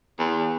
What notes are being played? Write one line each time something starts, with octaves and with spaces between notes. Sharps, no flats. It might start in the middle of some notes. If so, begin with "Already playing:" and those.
E2